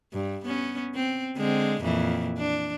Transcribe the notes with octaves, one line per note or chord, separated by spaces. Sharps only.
G2
B3 C#4
C4
D3 G#3 C4
F2 A#2 E3
D4